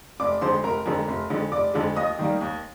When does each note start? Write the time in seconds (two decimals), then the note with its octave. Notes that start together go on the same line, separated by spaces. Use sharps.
0.20 F1 D5 D6
0.41 F2 D3 G#3 C5 C6
0.64 F1 A#4 A#5
0.86 F2 D3 G#3
1.08 F1
1.30 F2 D3 G#3
1.52 F1 D5 D6
1.74 F2 D3 G#3
1.96 D#2 D#5 D#6
2.19 D#3 G3 A#3
2.41 D#2